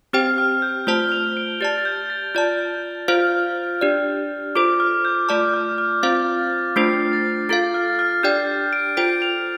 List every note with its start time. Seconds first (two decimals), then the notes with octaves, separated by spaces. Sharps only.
0.13 C4 G4 C5 G5 F6
0.38 F6
0.62 G6
0.87 A3 F4 C5 A5 G7
1.12 F7
1.37 D7
1.61 G4 D5 A5 A6
1.78 A6
1.85 G6
2.10 A6
2.35 F4 D5 A5 G6
3.08 F4 C5 F5 F6
3.81 D4 G4 D5
4.55 F4 A4 C5 D6
4.80 F6
5.05 G6
5.29 A3 F4 D5 A5 D6
5.54 F6
5.78 F6
6.03 C4 F4 C5 F5 A6
6.76 A3 D4 F4 C5 C7
7.13 A6
7.49 F4 A4 F5 A6
7.74 F6
7.99 F6
8.23 D4 G4 D5 G5 G6
8.73 D7
8.97 F4 A4 C5 G5 D7
9.22 F7